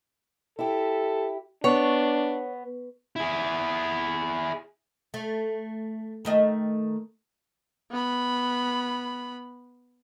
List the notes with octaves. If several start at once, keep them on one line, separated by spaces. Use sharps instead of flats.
E4 G4 A4
B3 D4 C#5
E4 G#4
A3
D#3 A3 D#5
B3 B5